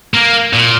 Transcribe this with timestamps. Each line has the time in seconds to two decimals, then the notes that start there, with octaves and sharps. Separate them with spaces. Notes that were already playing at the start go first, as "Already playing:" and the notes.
0.14 A#3
0.53 A#2